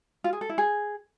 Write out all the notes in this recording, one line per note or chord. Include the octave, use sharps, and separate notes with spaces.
F4
G#4
A4
E4
G#4